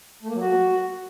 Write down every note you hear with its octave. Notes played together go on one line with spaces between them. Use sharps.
A3
A#3
F#3
F#4